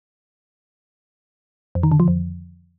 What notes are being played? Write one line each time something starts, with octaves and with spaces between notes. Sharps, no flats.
F2
D#3
D3
F3
F2